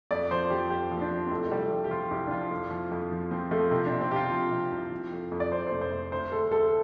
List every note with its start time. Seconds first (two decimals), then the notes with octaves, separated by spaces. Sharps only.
0.11 F2 D5
0.31 F3 C5
0.50 F3 G4
0.70 F2 G4
0.91 F3
0.97 C4
1.01 D4
1.11 F3
1.27 C4
1.31 C2 A3
1.47 A3
1.50 C3 G3
1.71 F3
1.84 G4
1.91 F3 F4
2.11 C2 G4
2.27 D4
2.31 F3 F4
2.51 F2
2.71 F3
2.91 F2
3.11 F3
3.31 F3 C4
3.51 F3 A3
3.71 C3 C4
3.86 C3 D4
4.01 C4
4.11 C3 F4 G4
4.32 F3
4.52 C3
4.72 C2
4.91 F3
5.12 F2
5.31 F2
5.40 D5
5.51 F2 C5
5.67 F1 C5
5.81 C5
5.92 F1
6.12 D2 C5
6.32 D2 A4
6.52 D2 A4